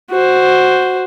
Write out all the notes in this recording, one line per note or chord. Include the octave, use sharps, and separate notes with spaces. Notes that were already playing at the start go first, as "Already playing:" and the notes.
F#4 C5